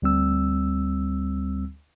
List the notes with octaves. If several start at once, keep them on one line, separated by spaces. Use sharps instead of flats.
D2 G3 C4 E6